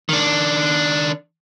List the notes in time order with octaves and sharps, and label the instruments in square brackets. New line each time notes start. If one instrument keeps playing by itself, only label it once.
[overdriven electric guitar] D#3 D4